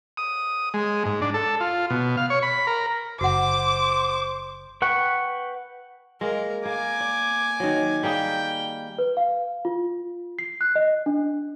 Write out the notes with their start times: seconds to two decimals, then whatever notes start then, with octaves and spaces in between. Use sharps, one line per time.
0.17 D#6
0.74 G#3
1.05 G#2
1.22 D4
1.34 A4
1.60 F4
1.90 B2
2.17 F5
2.30 C#5
2.43 B5
2.67 A#4
3.21 F#1 F#4 C5 F#5 D6
4.82 B4 F#5 G5 C#6
6.21 G#3 A#3 A#4
6.65 A#3 G#5 D6
7.00 D5
7.60 D#3 F#3
8.03 G3 A#3 G#4 G5
8.98 B4
9.17 F5
9.65 F4
10.39 C7
10.61 F#6
10.76 D#5
11.06 D4